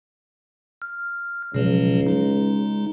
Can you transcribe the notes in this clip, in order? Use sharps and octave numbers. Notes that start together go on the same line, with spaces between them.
F6
C#2 B2 F3 F#3
G#3 D#4